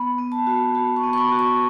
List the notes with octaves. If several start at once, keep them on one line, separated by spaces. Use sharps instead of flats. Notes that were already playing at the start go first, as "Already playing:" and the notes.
Already playing: B3 B5
B3
A5
F#4
F#4 B5
C#6
B3
C#6
B5
F#4
C#6